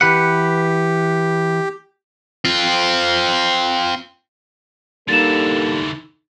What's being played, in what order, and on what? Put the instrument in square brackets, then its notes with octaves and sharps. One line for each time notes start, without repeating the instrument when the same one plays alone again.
[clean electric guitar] E3 B4 F#5 [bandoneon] G4
[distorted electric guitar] C4 F4
[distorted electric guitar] D3 E3 [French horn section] G3 A#3 A4 [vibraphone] D#4 [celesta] A6 E7